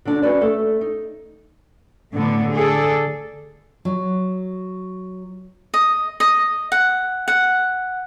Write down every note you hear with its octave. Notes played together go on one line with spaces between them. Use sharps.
D3 F#3 D4
C#4 F#4 B4 D5
A3 A4
D#4
A2 D3 B3
G#4 A4 D5
F#3
D#5
D#5
F#5
F#5